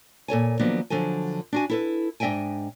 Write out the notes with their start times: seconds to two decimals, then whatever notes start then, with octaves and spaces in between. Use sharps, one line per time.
0.28 A#2 A4 C#5 G#5
0.59 D#3 F3 F#3 A#3 B3 D4
0.90 D3 F3 F#3 A4 G#5
1.53 D4 F#4 G#5
1.70 E4 A4 B4
2.20 G#2 D4 D#5 E5 G5 G#5